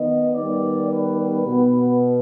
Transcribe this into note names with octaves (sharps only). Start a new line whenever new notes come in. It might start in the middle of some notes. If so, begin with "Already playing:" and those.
Already playing: D#3 B3 D#5
D#3 G3 B3 D5
B4
B2 B3